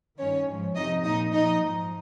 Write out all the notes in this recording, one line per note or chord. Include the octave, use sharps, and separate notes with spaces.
G2 D#3 C#4 C#5
G#2 F3
F2 C3 F3 D#4 D#5
A#2 F3 D#4 D#5
A#2 F3 D#4 D#5
G#2 F3